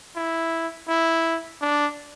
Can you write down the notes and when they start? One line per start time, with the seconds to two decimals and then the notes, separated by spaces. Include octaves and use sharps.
0.16 E4
0.88 E4
1.61 D4